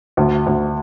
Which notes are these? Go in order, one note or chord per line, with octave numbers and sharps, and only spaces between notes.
D2
D2